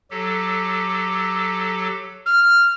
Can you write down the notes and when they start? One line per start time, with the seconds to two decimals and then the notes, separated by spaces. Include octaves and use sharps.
0.11 F#3 G4 A4
2.26 F6